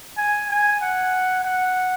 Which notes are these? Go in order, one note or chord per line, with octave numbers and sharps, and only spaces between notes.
G#5
G#5
F#5
F#5